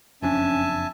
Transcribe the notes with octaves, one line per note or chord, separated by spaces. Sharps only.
F#1 F2 C#4 D4 E5 G#5 A5